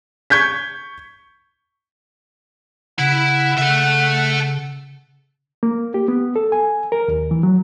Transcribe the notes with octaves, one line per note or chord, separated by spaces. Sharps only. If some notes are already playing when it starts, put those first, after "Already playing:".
C#6 G6 G#6 B6
C#3 E4 F#5 B5
C#3 A4 E5
A#3
G4
B3
A4
G#5
A#4
D#2
E3
F#3